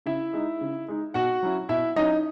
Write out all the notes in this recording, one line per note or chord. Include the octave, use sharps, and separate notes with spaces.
C#3 E4 E5
G#3 D#4
C#3
G#3 D#4
B2 F#4 F#5
F#3 C#4 E4
B2 E4 E5
F#3 C#4 D#4 E4 D#5